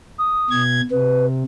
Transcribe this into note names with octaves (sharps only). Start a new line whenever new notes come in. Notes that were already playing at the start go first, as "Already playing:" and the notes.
D#6
B2 G#6
C3 B4